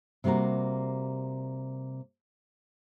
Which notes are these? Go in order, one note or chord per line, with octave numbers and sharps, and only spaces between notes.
C3 G3 A#3 F#4 A#4